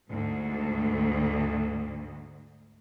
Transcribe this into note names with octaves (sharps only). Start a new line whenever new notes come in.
D2 G#2